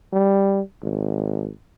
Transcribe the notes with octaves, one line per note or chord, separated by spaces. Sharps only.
G3
G#1